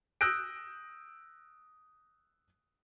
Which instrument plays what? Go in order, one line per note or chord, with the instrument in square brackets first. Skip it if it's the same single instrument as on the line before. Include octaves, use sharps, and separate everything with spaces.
[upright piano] D#6 E6 F#6 G6 A#6 D7